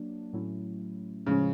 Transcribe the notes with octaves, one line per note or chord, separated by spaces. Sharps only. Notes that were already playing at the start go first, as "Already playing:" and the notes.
Already playing: F#3 A#3 D4
A2 F#3 A3 C#4 E4
A2 C#3 F3 G#3 C#4